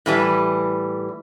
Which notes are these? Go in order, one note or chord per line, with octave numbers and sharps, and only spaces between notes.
A2 E3 G3